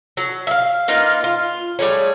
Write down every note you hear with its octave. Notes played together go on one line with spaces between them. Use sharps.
F#3
E5 F5
A#3 D#4 F4 B4
F4
G3 A3 G#4 C#5